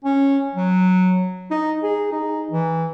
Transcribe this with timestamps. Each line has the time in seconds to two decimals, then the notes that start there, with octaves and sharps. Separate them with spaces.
0.04 C#4
0.55 F#3
1.51 D#4
1.83 G#4
2.12 D#4
2.51 E3